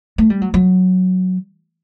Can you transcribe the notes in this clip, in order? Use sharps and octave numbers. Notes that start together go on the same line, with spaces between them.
A3
G3
F#3
F#3